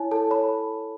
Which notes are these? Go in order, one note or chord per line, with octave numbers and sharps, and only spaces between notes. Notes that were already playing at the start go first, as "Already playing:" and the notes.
Already playing: E4 C#5 G#5 A5
A4 A5
C#5 B5